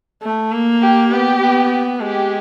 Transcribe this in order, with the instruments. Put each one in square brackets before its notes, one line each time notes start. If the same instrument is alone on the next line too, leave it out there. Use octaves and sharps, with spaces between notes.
[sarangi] A3
A#3
[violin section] G4
[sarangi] B3 [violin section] G4
[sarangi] B3
[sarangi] G#3 [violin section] G4